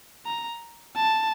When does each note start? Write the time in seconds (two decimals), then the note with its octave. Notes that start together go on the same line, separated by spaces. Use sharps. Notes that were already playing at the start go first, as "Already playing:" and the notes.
0.26 A#5
0.96 A5